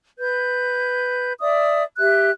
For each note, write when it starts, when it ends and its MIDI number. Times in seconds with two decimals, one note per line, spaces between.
0.20 1.33 71
0.20 1.33 91
1.41 1.83 74
1.41 1.83 76
1.41 1.83 87
1.98 2.31 67
1.98 2.31 76
1.98 2.31 90